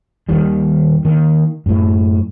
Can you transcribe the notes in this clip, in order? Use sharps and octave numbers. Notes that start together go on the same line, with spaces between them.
D#2 D#3 G3
D#3 A#3
F#2 A2